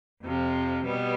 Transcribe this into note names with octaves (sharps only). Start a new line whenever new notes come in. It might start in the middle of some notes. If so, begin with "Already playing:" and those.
F2 C3 F3
B2 G3 B3